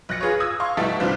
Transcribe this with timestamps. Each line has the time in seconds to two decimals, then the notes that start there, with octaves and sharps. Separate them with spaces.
0.09 B1 F#6 A#6 C#7
0.21 F4 G#4 B4 C#5
0.40 D#6 E6 G#6
0.60 F5 C6 C#6
0.77 B2 G3 A3 D#4 E4 A4
1.00 C2 D#3 C4 D4 F4